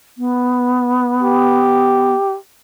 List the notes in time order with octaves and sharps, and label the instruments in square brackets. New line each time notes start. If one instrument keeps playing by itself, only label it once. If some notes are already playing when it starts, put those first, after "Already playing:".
[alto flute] B3
[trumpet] G4